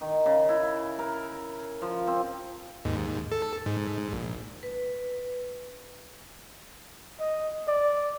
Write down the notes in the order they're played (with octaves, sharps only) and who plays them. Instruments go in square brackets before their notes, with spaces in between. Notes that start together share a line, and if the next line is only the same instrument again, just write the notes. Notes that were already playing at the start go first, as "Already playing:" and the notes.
[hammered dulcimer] D#3
C#3
E4
A#4
F3
C4
[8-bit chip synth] D#2 G#2
A4
G#2
A#1
[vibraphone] B4
[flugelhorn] D#5
D5